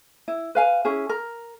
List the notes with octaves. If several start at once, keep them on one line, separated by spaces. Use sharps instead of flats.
E4
B4 F5 G#5
C#4 E4 G#4
A#4